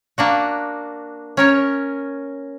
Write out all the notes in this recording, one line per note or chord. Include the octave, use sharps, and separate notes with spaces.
A#3 D4 F#4
C#4 A#4 C#5